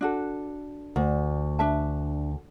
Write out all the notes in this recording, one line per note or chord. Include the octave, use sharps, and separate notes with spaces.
D4 F#4 A4
D2
D4 E5 A5